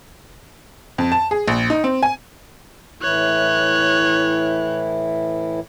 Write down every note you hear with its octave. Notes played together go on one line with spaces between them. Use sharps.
F2
A5
G#4
A#1
D#4
C4
G#5
A2 E3 E4 C#5 F#6